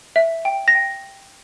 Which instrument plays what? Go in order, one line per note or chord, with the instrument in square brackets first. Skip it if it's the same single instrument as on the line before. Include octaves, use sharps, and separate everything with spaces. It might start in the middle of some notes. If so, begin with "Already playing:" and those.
[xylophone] E5
G5
A#6
G5